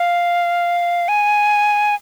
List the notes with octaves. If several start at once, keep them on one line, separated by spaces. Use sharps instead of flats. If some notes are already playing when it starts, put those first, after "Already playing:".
Already playing: F5
G#5